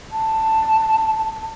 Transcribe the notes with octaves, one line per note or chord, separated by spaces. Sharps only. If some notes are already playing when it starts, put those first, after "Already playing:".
A5